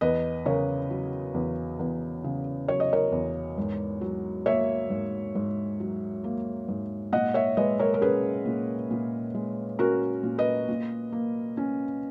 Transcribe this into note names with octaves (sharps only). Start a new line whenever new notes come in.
E2 B4 D#5
C#3 A#4 C#5
F#3
E2
E2
C#3
F#3 C#5
D#5
A#4 C#5
E2
G#2
F#3
A#3 C#5 E5
G#2
G#2
F#3
A#3
G#2
A#2 D#5 F#5
C#5 E5
G#3 B4 D#5
A#4 C#5
A#4
C#4 G#4 B4
A#2
A#2
G#3
C#4 F#4 A#4
A#2
B4 D#5
A#2
A#3
C#4